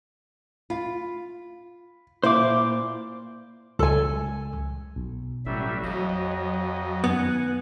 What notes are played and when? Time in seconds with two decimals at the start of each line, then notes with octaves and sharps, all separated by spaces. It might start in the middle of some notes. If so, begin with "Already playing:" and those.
0.70 F4 B5
2.24 A#2 E4 C5 F5 D6
3.79 C#2 A4 G#5
4.96 B1
5.46 A1 F#3 G3 E5
5.84 F2 F#3 D#5 F5
7.04 F#2 D#3 B3 F#5 G#5